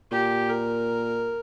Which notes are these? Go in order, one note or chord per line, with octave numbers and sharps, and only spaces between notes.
A#2 G4
A#4